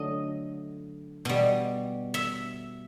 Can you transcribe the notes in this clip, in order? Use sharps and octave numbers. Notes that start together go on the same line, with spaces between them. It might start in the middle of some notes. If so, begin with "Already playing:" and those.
Already playing: D3 F#3 A3 D#5
B2 G3
E5